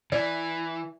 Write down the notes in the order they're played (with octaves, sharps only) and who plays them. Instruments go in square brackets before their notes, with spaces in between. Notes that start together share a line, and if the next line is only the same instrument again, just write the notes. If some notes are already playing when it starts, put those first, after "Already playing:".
[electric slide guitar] E3 [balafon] D5